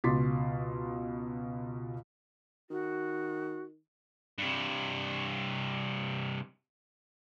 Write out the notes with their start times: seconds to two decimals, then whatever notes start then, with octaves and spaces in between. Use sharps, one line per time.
0.04 C#2 B2 C6 D6 A6 B6
2.70 D#3 F#4
4.38 G2 C3